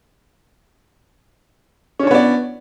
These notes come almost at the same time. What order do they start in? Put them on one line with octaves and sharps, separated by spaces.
C#4 D4 C#5 B3 D5